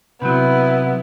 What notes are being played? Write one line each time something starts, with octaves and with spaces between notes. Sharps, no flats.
C3 F#3 B3 E4 B4